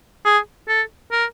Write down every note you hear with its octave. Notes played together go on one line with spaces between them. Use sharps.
G#4
A4
A#4